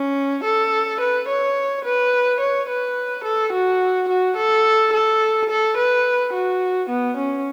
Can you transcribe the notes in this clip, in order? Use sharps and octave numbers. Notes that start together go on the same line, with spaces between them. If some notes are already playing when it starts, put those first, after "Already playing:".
Already playing: C#4
A4
B4
C#5
B4
C#5
B4
A4
F#4
F#4
A4
A4
A4
B4
F#4
B3
C#4